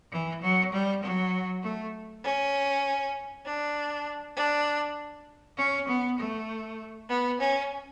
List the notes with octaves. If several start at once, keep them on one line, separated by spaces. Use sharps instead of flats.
E3
F#3
G3
F#3
A3
C#4
D4
D4
C#4
B3
A3
B3
C#4